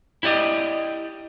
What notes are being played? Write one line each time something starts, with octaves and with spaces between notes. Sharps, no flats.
E4 G4 D5 D#5